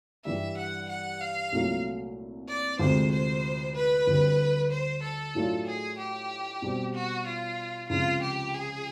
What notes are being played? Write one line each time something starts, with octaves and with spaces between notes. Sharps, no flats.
G2 E3 G3 E5
F#5
F#5
F5
C2 A#2 F#3 A3
D5
D2 C3 F3 G#3 C5
C5
B4
D2 D3 G3 C4
C5
A4
A2 F#3 A3 D4 F4
G#4
G4
B2 G3 C4
F#4
F4
C#2 C3 F3 F4
G4
G#4